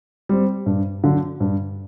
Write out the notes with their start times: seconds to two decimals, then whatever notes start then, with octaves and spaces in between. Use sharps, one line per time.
0.29 G3 C4
0.66 G2
1.04 D3 F#3
1.40 G2